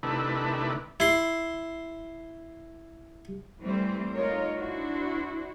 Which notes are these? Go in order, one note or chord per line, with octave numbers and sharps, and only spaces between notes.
C3 D#3 A3 D4 E4 B4
E4 C6
E3 G3 A3 C4 C5
A3 D#4 F4 A#4 C#5
D4 E4 F#4 C5